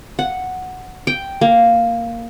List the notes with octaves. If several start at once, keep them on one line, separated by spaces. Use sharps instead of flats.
F#5
G5
A#3